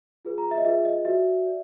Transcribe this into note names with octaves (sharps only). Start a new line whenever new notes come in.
F4 G#4 B4
A#5
E5
D#5
F4 G#4 B4 E5
D#5
F#4 B4 D5 E5
B4 D5